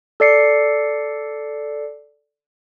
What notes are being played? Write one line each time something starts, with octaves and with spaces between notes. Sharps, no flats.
A4 D5 C7 C#7